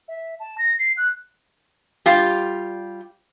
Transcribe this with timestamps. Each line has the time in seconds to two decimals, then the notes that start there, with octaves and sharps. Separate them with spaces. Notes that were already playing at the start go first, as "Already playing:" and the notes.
0.08 E5
0.40 A5
0.58 A#6
0.79 C7
0.97 F#6
2.06 G3 F4 G4